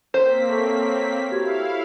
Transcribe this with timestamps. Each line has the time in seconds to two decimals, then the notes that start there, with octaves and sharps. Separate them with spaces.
0.14 A#3 C4 C5 B6
0.48 A3 C#5
1.32 E4 F#4 G4 F5 G#6